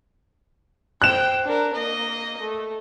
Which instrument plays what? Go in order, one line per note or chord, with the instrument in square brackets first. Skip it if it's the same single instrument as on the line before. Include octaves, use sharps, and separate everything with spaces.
[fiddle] C5 G5 [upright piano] F#6 E7
[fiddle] D4 A#4
A#3 D#5
A3